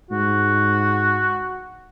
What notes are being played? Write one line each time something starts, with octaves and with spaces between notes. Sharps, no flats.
G#2 F#4